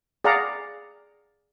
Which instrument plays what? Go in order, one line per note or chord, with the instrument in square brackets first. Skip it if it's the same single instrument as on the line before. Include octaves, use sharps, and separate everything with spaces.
[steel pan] G#4 D5 F5 F#5 A#5